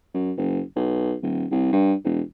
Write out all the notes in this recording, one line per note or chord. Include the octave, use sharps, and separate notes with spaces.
F#2
F#1
B1
D#1
C2
G2
E1